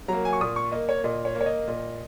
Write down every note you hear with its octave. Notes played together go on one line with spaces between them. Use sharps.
F#3 A#3 A#5
G#5
C#6
A#2 D#6
C#6
A#3 D#5
C#5
A#2 D#5
C#5
A#3
C#5
D#5
A#2